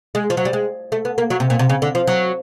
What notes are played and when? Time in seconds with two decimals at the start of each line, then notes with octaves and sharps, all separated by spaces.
0.15 G#3
0.30 F3
0.37 F#3
0.45 G3
0.53 G#3
0.92 A3
1.05 B3
1.18 A#3
1.30 F#3
1.40 C3
1.50 A#2
1.59 C3
1.70 C#3
1.82 D3
1.95 F3
2.07 F#3